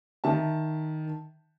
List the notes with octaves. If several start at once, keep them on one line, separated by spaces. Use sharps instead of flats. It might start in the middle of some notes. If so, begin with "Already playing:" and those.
D#3 E5 A5